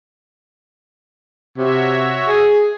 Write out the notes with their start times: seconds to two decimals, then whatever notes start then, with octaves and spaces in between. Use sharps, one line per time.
1.58 C3 F#4 C#5 E5
2.28 G#4